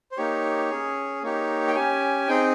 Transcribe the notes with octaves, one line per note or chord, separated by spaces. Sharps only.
C5
A#3 D#4 G4 C#5
C#4 G#4
A#3 D#4 G4 C#5
G5
C#4 G4 G#5
C4 D#4 G#4 G5